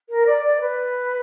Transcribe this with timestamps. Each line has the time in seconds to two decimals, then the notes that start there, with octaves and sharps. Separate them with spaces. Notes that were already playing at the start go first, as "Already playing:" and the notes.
0.10 A#4
0.26 D5
0.43 D5
0.61 B4